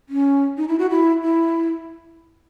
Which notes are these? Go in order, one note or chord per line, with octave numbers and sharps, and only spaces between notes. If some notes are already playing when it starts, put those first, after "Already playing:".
C#4
D#4
E4
F#4
E4
E4